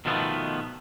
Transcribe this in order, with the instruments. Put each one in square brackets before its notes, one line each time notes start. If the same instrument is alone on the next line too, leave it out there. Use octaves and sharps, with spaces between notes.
[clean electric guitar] B2 D#3 F3 A3 B3